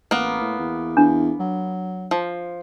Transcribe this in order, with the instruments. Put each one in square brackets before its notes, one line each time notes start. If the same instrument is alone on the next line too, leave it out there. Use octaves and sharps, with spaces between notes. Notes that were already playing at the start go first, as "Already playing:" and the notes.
[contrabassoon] A1 [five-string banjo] A#3 B3
[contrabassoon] A2
E2
[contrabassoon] E2 [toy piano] D4
[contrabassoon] F#3
[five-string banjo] F3